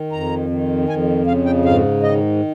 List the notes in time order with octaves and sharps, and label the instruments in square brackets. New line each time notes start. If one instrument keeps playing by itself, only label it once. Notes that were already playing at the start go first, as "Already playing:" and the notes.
Already playing: [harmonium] D#3
F2 A#5
D#3
F2 G#5
C#3 F5
G5
G#2 F5
D#3 D#5